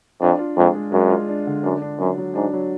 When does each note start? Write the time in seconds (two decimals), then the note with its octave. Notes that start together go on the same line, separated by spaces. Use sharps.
0.22 F2 D4
0.39 F4
0.57 F2 G#3
0.75 G#3
0.92 F#2 G#3
1.10 F4
1.28 D4
1.47 D3
1.64 F#2 D4
1.82 D4
1.99 F#2 F#3
2.18 F#3
2.35 G#2 D4
2.54 F#3